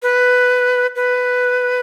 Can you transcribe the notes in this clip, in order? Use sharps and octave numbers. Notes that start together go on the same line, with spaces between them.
B4
B4